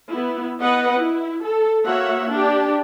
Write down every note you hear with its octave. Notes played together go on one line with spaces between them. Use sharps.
B3 E4
B3 B4 D#5 F#5
E4
A4
A#3 F#4 C#5 E5 F#5
D4 G4